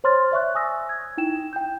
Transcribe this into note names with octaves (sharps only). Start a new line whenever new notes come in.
C5 C#5 C6 F6 A6
D5 E5 C#6 F#6
G#5 D#6 E6 A#6
G#6
D#4 E4 G5 E7
G5 G6